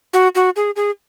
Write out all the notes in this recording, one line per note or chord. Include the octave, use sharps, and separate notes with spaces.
F#4
F#4
G#4
G#4